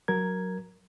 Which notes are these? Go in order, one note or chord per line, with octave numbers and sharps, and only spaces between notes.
F#3 A#4 G#6